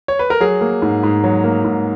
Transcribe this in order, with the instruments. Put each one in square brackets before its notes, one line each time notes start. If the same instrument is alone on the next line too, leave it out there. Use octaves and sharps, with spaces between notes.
[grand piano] C#5
B4
A#4
F#3 G#4
A#3
G#2
G#2
F#3
A#3
G#2